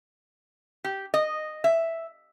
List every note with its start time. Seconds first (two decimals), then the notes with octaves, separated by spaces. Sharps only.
0.84 G4
1.14 D#5
1.64 E5